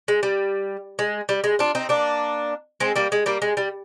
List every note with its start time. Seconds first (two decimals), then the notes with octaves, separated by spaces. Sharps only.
0.08 G#3
0.23 G3
0.99 G#3
1.29 G3
1.44 G#3
1.59 D4 F4
1.75 C4 D#4
1.89 A#3 D4
2.80 G#3 C4
2.96 G3 A#3
3.12 G#3
3.26 G3 A#3
3.42 G#3
3.57 G3